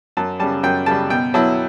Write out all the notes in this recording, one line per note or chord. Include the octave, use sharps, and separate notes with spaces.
F#2 A5
C#3 G3 A5
F#2 G5
C#3 G3 A5
B2 G5
F#3 B3 E4 A5